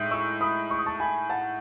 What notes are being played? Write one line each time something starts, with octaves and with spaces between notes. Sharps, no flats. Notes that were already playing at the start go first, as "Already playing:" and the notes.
Already playing: A2 G#3 D#4
C#6 E6
B5 D#6
C#6
D#6
A5 C#6
G#5 B5
F#5 A5